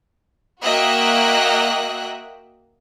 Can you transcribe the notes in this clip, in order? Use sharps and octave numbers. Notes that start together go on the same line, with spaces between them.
A#3 F#4 D#5 E5 G5 F#6